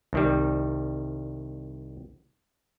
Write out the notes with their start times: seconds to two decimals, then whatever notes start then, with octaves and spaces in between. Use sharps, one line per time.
0.13 C2 D#3 G3